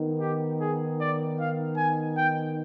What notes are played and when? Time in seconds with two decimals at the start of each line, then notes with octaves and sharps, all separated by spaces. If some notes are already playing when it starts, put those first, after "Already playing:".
Already playing: D#3 B3 D#4
0.20 G4
0.61 G#4
0.99 D5
1.38 F5
1.77 G#5
2.17 G5